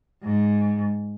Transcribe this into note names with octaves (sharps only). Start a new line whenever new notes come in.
G#2